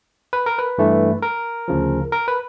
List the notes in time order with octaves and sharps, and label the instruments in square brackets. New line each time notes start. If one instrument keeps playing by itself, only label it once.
[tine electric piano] B4
A#4
B4
G2 E3 A3
A#4
D2 C#3 F3
A#4
B4